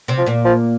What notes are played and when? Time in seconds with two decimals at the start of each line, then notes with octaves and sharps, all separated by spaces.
0.08 C3 C4
0.18 F3
0.26 A#2 A#3
0.45 F3